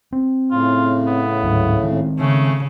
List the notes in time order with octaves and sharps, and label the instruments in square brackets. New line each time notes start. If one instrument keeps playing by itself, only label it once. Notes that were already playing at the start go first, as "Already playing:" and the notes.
[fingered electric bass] C4
[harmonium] A2 C#3 [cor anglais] F4
[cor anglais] B3
[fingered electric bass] D2 G#2 F#3
D#3 G#3 C4
[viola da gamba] C#3 [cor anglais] A3